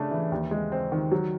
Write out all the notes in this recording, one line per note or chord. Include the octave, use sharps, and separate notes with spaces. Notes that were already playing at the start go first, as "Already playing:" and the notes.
Already playing: C#3 A3 D4
E3
D#2
G#3
C4
D#3
F#3